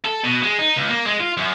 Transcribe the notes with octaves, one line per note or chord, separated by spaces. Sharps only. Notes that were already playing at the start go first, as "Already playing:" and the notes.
A4
B2
G#3
D#4
C#2
A#3
G#3
F4
F#2